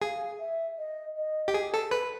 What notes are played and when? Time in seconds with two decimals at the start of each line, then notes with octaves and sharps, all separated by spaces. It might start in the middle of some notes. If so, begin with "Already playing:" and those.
0.02 G#4 F5
0.40 E5
0.78 D#5
1.17 D#5
1.48 G4
1.54 G#4
1.74 A4
1.91 B4